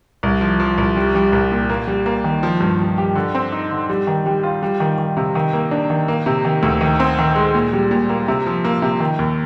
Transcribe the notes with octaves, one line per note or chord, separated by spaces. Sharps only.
C2
F3
F3
C2
G3
G3
C2
A#2
A#3
G3
A#3
D#3
F3
G2
F3
G4
D3
C4
D#4
D3
G3
D#3
G3
F4
G3
D#3
D#3
C3
D#3
A#3
D4
D#3
A#3
C3
D#3
D2
D#3
C4
D#3
G#3
A#2
G3
A#2
A#3
C3
F3
A#3
C3
D#3
D#2